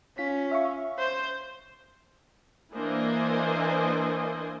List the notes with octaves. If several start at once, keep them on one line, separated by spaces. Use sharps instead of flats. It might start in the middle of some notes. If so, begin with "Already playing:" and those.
C#4 F4 B6
E5 F5 C#6
C5
E3 A#3 D4 C5 D#5 G#5